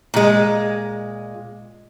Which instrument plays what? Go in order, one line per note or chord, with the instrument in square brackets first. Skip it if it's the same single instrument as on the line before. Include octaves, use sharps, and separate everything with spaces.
[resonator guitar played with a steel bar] A#2 G#3